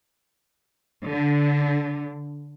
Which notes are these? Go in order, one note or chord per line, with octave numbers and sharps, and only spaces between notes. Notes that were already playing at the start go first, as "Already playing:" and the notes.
D3